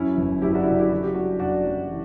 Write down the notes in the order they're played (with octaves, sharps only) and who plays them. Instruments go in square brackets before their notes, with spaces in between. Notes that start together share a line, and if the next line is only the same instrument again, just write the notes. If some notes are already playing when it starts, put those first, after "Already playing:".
Already playing: [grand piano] F#2 [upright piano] C#4 E4
[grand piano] G1
[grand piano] F#2 [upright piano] E4 G4
[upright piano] D4 F#4
E4
[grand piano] C#3 [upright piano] D4 F#4
[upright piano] E4 G4
[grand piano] F#2 [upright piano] F#4
[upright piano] G4
[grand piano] G3 [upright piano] D4 F#4
[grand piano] F#1 [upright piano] D4 F#4
[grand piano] F#2
E3